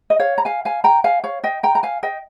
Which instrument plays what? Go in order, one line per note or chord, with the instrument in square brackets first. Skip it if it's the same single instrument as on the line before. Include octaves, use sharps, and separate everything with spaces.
[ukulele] D#5
C#5 F5
A#5
F5 G#5
F5 G#5
G5 A#5
F5 G#5
C#5 F5
D#5 G5
G5 A#5
A#5
F5 G#5
D#5 G5